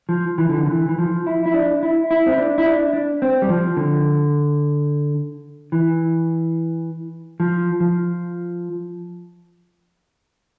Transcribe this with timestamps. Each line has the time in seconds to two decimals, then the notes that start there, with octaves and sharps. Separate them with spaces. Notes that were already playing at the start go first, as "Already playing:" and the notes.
0.09 F3
0.38 E3
0.49 D3
0.66 D3
0.71 E3
0.89 E3
0.99 F3
1.27 E4
1.46 E4
1.54 D4
1.83 E4
2.11 E4
2.26 C4
2.38 D4
2.58 E4
2.66 D4
2.93 D4
3.22 C4
3.42 G3
3.49 F3
3.77 D3
5.72 E3
7.40 F3
7.80 F3